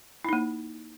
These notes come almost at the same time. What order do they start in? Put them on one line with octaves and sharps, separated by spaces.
E4 D#4 A#3